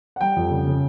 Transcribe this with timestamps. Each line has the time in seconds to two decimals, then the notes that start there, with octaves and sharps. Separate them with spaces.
0.16 F#5
0.21 G3 G5
0.36 F2
0.51 C#3
0.67 C#3